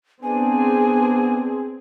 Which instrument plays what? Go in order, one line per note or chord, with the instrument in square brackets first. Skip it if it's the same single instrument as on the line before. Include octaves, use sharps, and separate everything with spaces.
[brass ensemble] B3 D4 [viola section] C4 G#4 [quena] G#5